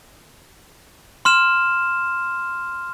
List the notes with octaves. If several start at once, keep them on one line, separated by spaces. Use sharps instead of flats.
C6 F6 E7